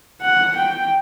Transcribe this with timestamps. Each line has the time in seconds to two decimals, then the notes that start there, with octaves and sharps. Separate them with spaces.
0.22 F#5
0.56 G5